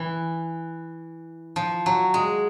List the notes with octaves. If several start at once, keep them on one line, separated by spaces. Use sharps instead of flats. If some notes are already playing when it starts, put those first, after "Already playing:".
Already playing: E3
F3
F#3
G#3